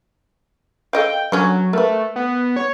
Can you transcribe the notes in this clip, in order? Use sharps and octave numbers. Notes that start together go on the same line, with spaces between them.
A4 D#5 F5 G5
D3 F#3 C#4 G#5
A3 A#4 B4
B3
C#5